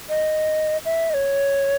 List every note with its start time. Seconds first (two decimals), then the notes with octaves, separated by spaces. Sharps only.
0.09 D#5
0.85 E5
1.10 D#5
1.14 C#5